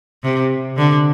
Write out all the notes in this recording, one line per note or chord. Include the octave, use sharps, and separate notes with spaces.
C3
D3